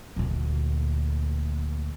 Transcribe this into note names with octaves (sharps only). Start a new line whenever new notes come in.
D2 A#2